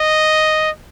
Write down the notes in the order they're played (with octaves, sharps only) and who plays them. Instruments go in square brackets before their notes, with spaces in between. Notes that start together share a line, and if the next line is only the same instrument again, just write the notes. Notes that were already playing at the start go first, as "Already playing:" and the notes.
Already playing: [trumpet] D#5